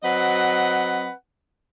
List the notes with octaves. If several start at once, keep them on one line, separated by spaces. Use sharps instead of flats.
F#3 C4 B4 D#5 F#5